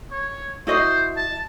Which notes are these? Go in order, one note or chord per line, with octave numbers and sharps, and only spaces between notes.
C#5
E4 F#4 C5 D#5
A5